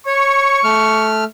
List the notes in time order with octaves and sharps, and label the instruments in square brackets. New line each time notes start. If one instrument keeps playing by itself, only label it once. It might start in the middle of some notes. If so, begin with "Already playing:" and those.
[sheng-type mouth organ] C#5 [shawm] C#6
[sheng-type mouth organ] A3 F6